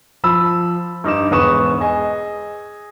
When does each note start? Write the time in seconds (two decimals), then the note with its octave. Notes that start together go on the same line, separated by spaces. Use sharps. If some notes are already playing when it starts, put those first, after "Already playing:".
0.24 F3 B5 E6
1.04 G2 D#4 D6 E7
1.31 E1 G#2 B4 C#6 D#6 E7
1.80 G#4 D#5 G#5